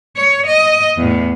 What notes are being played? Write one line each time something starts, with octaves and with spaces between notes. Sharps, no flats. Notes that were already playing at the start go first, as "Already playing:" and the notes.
C#5
D#5
E2 A2